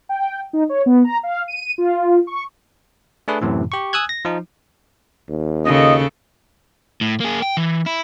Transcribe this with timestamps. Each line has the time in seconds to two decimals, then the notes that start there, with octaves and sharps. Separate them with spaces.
0.09 G5
0.53 D#4
0.69 C#5
0.86 B3
1.04 A#5
1.23 F5
1.48 D#7
1.78 F4
2.27 C#6
3.28 A3 D4 G#4 B4
3.41 F#2 A2 C3 E3
3.72 G4 C#6
3.93 G#5 D#6 E6 F#6 G#6
4.09 A#6
4.25 F3 D#4
5.29 D#2
5.66 C#3 F4 A4 D#5
7.01 A2
7.20 A#3 G#4
7.42 G5
7.57 E3
7.86 E4